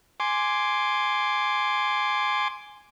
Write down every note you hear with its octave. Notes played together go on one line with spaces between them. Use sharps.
G#5 C6 D6